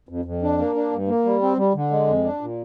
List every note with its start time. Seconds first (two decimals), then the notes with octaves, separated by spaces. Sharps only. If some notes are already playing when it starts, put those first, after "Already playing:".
0.09 F2
0.25 F2
0.42 D4
0.59 A#3
0.75 D4
0.91 G2
1.08 A#3
1.25 G3
1.42 C4
1.57 G3
1.74 D3
1.91 G#3
2.07 F2
2.24 D4
2.41 A#2